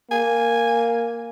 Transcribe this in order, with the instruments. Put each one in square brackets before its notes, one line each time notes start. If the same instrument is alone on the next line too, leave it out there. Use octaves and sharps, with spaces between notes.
[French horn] A#3 [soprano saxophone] G#5